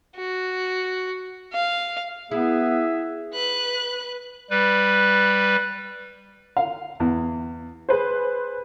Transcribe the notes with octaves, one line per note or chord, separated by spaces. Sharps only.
F#4
F5
B3 E4 G#4 E5
B4 F#6
G3 B4
F5
E2
G#4 B4 C5